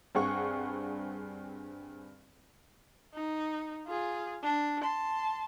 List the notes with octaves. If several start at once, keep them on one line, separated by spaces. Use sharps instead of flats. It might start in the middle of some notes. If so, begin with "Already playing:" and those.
G2 C4 G#4 F#5 C#6
D#4
F4 G#4
D4
A5 C6